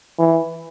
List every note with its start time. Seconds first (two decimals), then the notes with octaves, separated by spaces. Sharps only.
0.19 E3